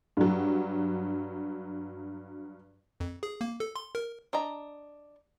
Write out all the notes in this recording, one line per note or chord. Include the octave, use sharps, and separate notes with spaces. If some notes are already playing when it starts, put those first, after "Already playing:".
G2 F#3
F2
G#4
A#3
A4
C6
A#4
D4 D#5 A#5